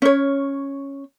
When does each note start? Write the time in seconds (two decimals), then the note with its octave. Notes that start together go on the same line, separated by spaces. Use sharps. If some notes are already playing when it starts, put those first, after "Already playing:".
0.02 C#4 C#5